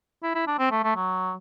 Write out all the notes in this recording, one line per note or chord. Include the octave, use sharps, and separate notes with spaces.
E4
E4
D4
C4
A3
A3
F#3